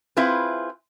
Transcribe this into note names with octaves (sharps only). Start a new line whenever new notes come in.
C4 E4 F4 G#4 B4